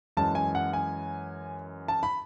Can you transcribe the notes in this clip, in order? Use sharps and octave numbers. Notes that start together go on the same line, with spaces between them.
F#2 E3 G#3 A5
G#5
F#5
G#5
A5
B5